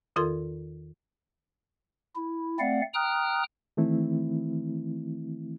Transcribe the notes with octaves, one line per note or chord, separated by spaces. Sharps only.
E2 D#3 F4 A4 A#4 C6
E4
A3 C4 D5 F5 F#5
G5 A#5 D#6 F6 F#6
D#3 E3 A3 C4 E4